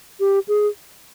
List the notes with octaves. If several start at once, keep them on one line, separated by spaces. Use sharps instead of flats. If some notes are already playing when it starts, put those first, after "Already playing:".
G4
G#4